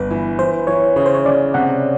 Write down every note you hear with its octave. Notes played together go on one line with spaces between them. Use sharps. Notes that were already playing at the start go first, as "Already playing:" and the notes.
Already playing: G1 B4
E3
E3 C5
E3 C#5
C#3 C#5
C5
C#5
C#3 D5
C3 F#5